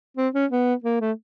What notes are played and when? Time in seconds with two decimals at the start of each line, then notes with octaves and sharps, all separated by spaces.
0.17 C4
0.34 C#4
0.51 B3
0.84 A#3
1.00 A3